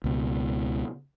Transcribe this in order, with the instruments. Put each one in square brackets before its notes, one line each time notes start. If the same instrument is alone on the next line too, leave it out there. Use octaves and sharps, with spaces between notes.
[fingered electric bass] C#2 B2